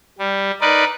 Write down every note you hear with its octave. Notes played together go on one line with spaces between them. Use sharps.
G3
D#4 A#4 B4 D5